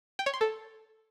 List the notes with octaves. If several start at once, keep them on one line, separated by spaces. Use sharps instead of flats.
G5
C#5
C6
A4